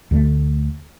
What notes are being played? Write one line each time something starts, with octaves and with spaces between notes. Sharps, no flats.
D2 D3 F3 A3